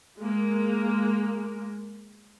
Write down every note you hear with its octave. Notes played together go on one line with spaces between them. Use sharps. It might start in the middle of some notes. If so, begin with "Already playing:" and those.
G#3 A#3